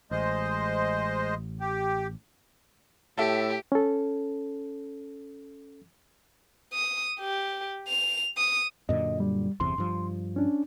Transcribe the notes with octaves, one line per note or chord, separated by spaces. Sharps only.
A1 G#3 C5 D#5
G4
A2 G4 A4 E5
C#4 A4
D#6
G4
F7
D#6
F#2 A#2 D3 D#5
G3
G1 E2 C3 C6
G2 F3
C#4 D4